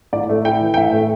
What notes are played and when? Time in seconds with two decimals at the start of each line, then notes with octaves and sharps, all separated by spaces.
0.13 A2 D5
0.29 A3
0.45 E4 G5
0.61 E3
0.74 G5
0.77 A2 E5
0.93 A3